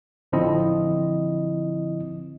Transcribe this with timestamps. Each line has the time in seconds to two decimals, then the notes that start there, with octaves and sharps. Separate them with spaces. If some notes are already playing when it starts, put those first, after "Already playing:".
0.32 A1 D3 F3 C4 E4 D#5